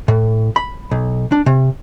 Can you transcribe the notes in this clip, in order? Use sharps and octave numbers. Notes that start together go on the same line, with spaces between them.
A2
B5
B1
D4
C3